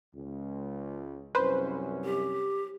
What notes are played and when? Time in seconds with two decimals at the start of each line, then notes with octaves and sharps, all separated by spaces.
0.14 C#2
1.35 C2 F#2 C#4 B4 C5
2.05 G4